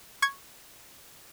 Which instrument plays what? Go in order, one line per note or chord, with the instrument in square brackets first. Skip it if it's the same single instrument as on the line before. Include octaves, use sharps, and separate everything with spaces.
[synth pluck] C#6 G#6